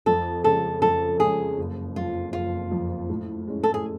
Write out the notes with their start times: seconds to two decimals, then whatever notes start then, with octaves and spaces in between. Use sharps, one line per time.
0.06 F2 A4
0.44 C#3 G#3 C#4 A4
0.82 F2 A4
1.20 C#3 G#3 C#4 G#4
1.58 F#1
1.96 F2 F3 F4
2.33 F#1 F4
2.71 F2 F3
3.09 A2
3.48 G#3 C#4
3.63 A4
3.74 G#4